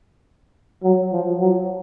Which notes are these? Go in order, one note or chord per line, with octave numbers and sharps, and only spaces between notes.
F#3
F3
F#3